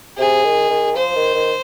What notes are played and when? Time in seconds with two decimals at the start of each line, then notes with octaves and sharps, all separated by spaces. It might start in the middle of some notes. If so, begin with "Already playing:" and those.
0.18 C3 G#4
0.44 D#3
0.70 D#3
0.96 F3 C5
1.15 D#3
1.35 D#3